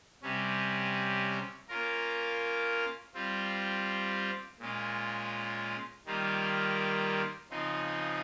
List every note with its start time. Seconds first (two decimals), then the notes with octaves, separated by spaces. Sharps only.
0.22 C3 G3 C#4
1.68 A#3 C#4 F4 A#4
3.14 G3 C4 F4
4.59 A#2 G#3 C#4 F4
6.06 D#3 G3 A#3 F4
7.50 C#3 F3 C4 D#4